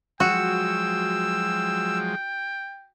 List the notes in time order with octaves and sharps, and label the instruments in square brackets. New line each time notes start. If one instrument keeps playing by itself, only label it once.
[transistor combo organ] F3 F#3 G#3 [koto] F#4 [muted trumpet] G5 [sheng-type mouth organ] E6